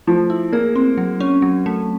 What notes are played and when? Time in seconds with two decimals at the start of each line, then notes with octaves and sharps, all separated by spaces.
0.07 F3 A3
0.30 E4
0.52 A#3 G#4
0.76 C4
0.98 F#3
1.20 C#4
1.42 F#3
1.66 A3